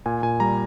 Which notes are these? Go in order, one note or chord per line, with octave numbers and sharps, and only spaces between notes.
A#2 G#5
A#2 G#5
G3 A#5